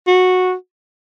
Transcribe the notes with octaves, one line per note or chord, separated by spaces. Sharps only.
F#4